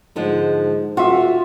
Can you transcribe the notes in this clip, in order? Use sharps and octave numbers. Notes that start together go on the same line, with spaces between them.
G#2 D3 F3 G#3
D#1 F4 F#4 E5 D6